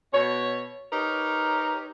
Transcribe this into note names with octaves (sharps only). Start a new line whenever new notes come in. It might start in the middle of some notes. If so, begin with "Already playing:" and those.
B2 C#5
D#4 G4 A#4 B4 C#5